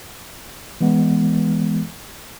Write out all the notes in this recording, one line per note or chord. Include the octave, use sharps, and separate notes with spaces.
E3 G#3 B3